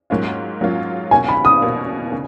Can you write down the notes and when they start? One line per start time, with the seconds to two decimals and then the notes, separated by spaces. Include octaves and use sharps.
0.10 G#2 F#3 A#3 C#4 F4
0.61 G#2 F#3 A#3 C#4 F4
1.11 B2 A#3 C#4 G#5
1.28 B5
1.45 D#6
1.62 B2 A#3 C#4
2.12 C#3